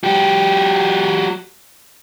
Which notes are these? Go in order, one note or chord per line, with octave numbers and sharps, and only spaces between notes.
F#3 G4